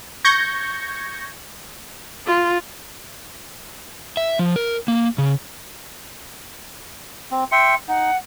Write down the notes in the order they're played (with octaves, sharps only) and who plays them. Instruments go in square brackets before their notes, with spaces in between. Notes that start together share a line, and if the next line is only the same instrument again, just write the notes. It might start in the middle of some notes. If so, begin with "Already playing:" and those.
[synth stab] C#6 G6 G#6 A#6 C#7
[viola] F4
[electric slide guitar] E5
F3
A#4
A#3
C#3
[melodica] C4
[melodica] E5 G5 C6 [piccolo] C#7
[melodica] D#4 [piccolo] F#5